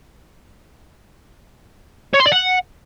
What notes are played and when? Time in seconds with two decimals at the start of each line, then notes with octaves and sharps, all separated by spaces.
2.13 C#5
2.20 C6
2.26 D5
2.32 F#5